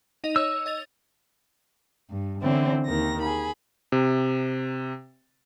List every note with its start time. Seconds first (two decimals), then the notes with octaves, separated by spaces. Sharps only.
0.24 D#4 D#5 F7
0.36 C#5 E6
0.66 D#5 A6 F7
2.09 G2
2.42 D3 E3 C4 C#4 E4
2.85 D#2 D#3 A#6
3.21 G#4 B5
3.92 C3